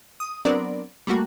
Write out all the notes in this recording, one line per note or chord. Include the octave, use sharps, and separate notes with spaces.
D#6
F#3 B3 C4 D4 A#4 D5
G3 A3 A#3 F#4